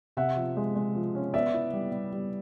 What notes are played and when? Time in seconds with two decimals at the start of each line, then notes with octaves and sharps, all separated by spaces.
0.17 C3 E5 F#5
0.36 F3
0.57 G#3
0.76 G#3
0.95 F3
1.15 C#4
1.34 B3 D5 E5
1.54 E4
1.73 G3
1.92 G3
2.12 G3